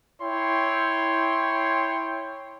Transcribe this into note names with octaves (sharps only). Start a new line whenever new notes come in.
E4 C#5 G5 C6